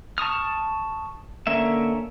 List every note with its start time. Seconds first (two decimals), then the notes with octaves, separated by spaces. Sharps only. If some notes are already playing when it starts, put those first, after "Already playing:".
0.18 A5 C#6 D#6 F6
1.47 D3 A#3 C#4 E5